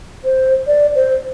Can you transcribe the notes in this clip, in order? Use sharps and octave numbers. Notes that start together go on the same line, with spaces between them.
C5
D5
C5